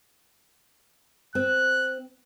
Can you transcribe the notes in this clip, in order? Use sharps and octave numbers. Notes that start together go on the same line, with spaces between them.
C4 F#6